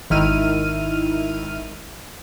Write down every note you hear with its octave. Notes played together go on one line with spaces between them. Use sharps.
G#1 D#3 E4 F6 D#7